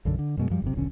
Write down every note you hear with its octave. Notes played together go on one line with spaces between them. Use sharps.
B1 F#2 D3
D3
F#2 B2 G#3
F#2 F3 G3
G1 F#2 C3
D#1 B1 D3 C#4